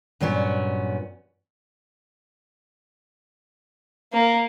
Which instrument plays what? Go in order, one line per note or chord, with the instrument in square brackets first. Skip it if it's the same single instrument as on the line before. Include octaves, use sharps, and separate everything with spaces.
[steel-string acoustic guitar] G2 A#2 F#3 B3 C#4
[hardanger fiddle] A#3